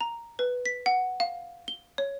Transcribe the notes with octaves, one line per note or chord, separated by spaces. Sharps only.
A#5
B4
B6
F#5
F5
G7
C#5